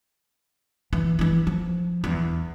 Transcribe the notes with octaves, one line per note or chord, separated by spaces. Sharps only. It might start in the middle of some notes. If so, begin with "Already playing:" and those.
E3
E3 E4
F3
E2